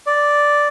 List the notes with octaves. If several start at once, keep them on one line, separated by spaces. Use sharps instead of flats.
D5